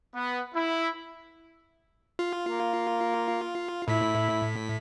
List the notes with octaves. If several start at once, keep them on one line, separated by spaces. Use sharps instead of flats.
B3
E4
F4
A#3
A2 E4 B6